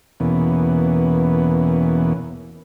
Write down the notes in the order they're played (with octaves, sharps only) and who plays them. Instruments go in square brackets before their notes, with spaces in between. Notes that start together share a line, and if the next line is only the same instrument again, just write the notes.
[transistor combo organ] E2 B2 E3 A#3 B3 C#4